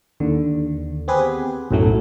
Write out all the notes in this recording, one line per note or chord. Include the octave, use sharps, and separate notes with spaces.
D#2 D3
B3 C4 G4 G#4 B4
B1 F#2 A2 F#3 A3